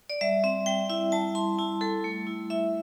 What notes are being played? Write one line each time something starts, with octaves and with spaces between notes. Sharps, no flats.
D5
G3 E5
C4 E5
G3 G5
E4 E5
G3 A5
E4 C6
E4 A5
G3 A4
A3
E4
E4 E5